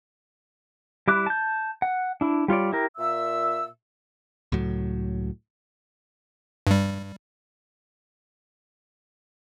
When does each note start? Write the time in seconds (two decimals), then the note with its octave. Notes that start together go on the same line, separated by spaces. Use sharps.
1.08 G3 E4 D6 F#6
1.26 A5 G6
1.82 F#5
2.21 D4 E4
2.48 G3 F4 C#5 D5
2.73 E4 G4 A#4
2.98 A#2 E5 E6
4.52 C#2 A2 F#3
6.67 G2 G3